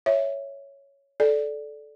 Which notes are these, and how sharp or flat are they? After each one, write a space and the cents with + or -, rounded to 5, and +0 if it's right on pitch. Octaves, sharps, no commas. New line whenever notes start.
C#5 +0 E5 +0
A4 -15 D5 +0